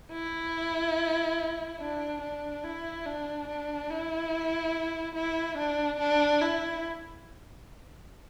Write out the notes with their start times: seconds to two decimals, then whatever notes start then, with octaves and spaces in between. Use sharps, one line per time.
0.12 E4
1.80 D4
2.22 D4
2.64 E4
3.06 D4
3.48 D4
3.90 E4
5.15 E4
5.58 D4
5.99 D4
6.41 E4